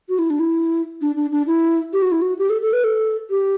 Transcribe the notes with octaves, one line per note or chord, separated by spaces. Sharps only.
F#4
E4
D4
E4
D4
D4
D4
E4
G4
F#4
E4
F#4
G4
A4
A4
B4
A4
G4